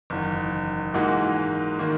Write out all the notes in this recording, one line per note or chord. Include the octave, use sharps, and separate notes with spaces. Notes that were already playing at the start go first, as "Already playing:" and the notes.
F#1 E2 D#3
G#2 E3 A#3 D#4 F#4
D#3 A#3